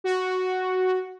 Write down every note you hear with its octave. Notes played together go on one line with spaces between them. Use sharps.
F#4